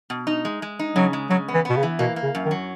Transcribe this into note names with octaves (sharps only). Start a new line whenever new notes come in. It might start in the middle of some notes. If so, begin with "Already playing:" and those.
B2
D#4
G#3
G#3
D#4
C#3 F#3
G#3
C#3 F#3
B3
E3
B2 B3
C#3
E3
B2 A#3
A#3
C#3
F#2
D#3
F#3